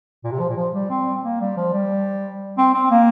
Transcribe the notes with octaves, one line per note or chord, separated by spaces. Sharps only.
A#2
C3
F3
A#2
F3
G3
C4
A#3
G3
F3
G3
C4
C4
A#3